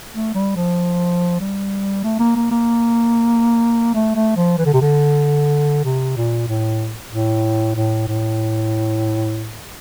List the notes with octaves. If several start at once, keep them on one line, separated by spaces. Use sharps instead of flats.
A3
G3
F3
G3
A3
A#3
A#3
A#3
A3
A3
F3
E3
D3
C3
D3
C3
A#2
A2
A2
A2
A2